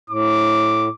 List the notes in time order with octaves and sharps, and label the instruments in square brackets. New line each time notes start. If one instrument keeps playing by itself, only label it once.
[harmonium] A2 [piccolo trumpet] D6